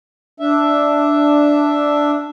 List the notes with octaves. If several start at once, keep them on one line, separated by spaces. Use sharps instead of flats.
D4 E5